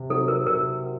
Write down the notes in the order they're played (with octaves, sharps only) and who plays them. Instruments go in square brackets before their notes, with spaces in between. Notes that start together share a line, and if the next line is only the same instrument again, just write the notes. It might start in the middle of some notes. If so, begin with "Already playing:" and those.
Already playing: [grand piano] C3
[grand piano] F#3 C4 D#4 F#4 [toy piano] A4
[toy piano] A#4
[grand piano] C3 [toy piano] A#4
[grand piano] F#4